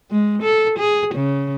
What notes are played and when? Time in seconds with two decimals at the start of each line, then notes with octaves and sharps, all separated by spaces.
0.11 G#3
0.43 A4
0.79 G#4
1.15 C#3